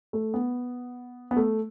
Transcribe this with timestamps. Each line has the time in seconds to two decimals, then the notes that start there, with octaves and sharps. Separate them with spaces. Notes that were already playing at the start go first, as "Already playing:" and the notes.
0.13 A3
0.34 B3
1.31 B3
1.37 A3